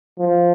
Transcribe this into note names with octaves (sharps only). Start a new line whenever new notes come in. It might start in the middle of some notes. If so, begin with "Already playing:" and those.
F3